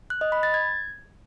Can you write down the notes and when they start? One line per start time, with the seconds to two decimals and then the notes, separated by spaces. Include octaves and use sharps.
0.10 F#6
0.21 D#5
0.32 B5
0.43 A6
0.54 G#6